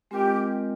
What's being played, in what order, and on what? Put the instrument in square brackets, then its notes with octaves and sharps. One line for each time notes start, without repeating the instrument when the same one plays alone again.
[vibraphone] G#3 C4 F4 A#4 D#5 [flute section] G4